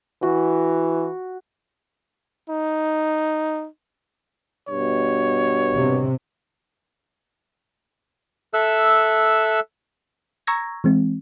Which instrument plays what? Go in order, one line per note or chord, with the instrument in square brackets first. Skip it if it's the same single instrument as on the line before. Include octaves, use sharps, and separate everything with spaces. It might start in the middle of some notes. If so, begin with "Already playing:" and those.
[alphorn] E3 [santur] F#4
[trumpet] D#4
[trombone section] G2 B2 [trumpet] C#5
[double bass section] C3
[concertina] A4 E5 E6 F#6
[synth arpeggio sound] A#5 C#6 E6 G#6 A#6
E3 G#3 C4